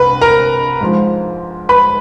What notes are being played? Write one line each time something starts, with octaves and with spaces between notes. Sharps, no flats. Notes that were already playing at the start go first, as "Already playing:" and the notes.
Already playing: C2 B4 B5
A#4 A#5
G#2 F3
B4 B5